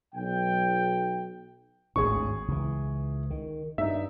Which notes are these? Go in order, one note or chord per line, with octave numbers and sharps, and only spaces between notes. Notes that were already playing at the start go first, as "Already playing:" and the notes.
B1 G5
G#1 D2 A2 G#4 C#6
C#2 E3
D#3
G2 D#4 E5